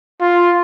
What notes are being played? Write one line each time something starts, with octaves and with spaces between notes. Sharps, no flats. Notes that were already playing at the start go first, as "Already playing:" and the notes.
F4